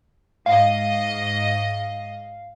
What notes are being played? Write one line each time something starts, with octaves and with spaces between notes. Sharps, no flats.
G#2 D#5 F5